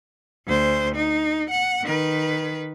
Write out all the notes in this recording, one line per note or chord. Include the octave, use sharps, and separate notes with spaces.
D2 C5
D#4
F#5
D#3 B4